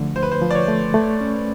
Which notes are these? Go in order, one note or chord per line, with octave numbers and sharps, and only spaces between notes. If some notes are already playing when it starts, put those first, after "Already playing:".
Already playing: D3 F3 A3
D2 C5
B4
C5
F3
D5
C#5
A3
A3
C#4